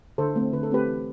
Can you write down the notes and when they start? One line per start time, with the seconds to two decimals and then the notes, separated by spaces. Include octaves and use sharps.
0.18 D3 A4 C5
0.36 A3 C4
0.53 D3 B4
0.63 A4
0.71 A3 C4 G4 B4
0.88 E3